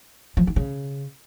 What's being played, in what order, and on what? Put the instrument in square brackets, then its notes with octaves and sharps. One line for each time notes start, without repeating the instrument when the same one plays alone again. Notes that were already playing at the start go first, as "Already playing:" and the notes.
[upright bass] F3
D#3
C#3